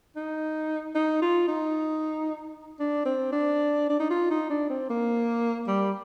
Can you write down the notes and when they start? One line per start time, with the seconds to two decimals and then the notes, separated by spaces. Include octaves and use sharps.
0.16 D#4
0.95 D#4
1.22 F4
1.48 D#4
2.79 D4
3.05 C4
3.32 D4
3.90 D4
4.00 D#4
4.10 F4
4.31 D#4
4.50 D4
4.70 C4
4.90 A#3
5.67 G3